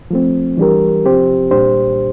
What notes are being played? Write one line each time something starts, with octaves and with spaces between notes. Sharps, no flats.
F3 A3 C4
E3 G3 D4 G4 A#4
C3 F3 C4 G4 C5
A#2 G3 D4 G4 C5